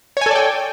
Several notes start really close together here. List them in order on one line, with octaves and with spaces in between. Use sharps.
C#5 G#5 A4 D5 G5